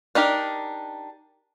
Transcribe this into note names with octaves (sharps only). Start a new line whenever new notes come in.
D4 D#4 G4 A#4